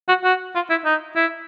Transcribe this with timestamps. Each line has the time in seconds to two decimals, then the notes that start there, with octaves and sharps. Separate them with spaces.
0.09 F#4
0.24 F#4
0.55 F4
0.70 E4
0.85 D#4
1.16 E4